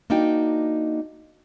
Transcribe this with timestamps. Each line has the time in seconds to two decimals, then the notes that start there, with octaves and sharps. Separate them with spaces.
0.10 A#3 D4 D#4 F#4 G5